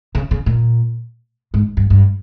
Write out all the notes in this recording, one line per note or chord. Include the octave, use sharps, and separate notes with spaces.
C#3
C#3
A#2
G#2
G2
G2